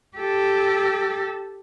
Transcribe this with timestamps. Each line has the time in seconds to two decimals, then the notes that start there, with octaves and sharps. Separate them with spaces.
0.17 G4 A4